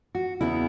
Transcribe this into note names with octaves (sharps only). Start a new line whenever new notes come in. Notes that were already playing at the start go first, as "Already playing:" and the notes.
F#4
E2 C#3 E3 B3 E4